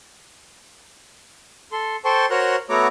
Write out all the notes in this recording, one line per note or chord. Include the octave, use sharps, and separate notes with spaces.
A4 C6
A4 C5 G5 A5 C6 C#6
F#4 A#4 C5 C#5 A#5 F#6
A3 B3 F#4 C#5 A#5 D6